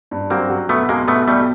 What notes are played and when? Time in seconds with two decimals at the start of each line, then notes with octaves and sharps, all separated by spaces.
0.11 G2
0.30 F#3 A#3 C4
0.50 F#3
0.69 B1 A3 B3
0.89 B1 G#3 A#3
1.08 B1 A3 B3
1.27 B1 G3 A3